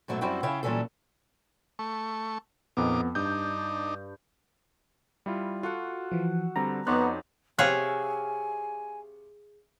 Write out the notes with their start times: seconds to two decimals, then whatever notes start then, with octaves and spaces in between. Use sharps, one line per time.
0.08 G#2 B2 F#3 A3
0.21 F#2 G3 C4 E4 F#4 G5
0.43 C#3 E4 C#5 F5 G5
0.63 A#2 E3 F#3 G3 C#4 A4
1.79 A3 C#6
2.77 F2 A#2 B3 D#4 D6
3.15 G2 D4 D#4 G6
5.26 G3 E4 F4
5.63 F4 F#4 A4 F#5
6.11 E3 F3
6.56 D3 G3 C4 B4 A#5
6.87 F2 B3 D#4 C#5 D5 C6 F#6
7.59 C3 G#4 C#5 E5 F5 G#5 F#6